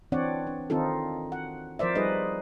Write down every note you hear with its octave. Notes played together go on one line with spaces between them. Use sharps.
E3 C4 D4 C#5 D5 F#5
D4
D#3 C4 D#4 F4 A4
F#5
F3 A#4 C5 D5 E5
G3 D#4 G#4 B4 D#5